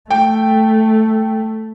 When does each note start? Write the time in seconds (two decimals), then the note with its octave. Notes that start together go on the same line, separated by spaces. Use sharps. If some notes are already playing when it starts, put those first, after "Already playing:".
0.10 A3 G5